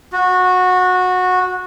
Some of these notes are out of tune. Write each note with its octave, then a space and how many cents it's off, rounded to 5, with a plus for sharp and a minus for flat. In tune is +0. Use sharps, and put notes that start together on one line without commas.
F#4 -15